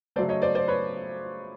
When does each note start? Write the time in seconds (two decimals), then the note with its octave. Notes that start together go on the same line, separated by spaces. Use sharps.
0.16 C#3 F#3 A3 C5 D5
0.29 C#5 D#5
0.42 C5 D5
0.55 C5 D5
0.68 B4 C#5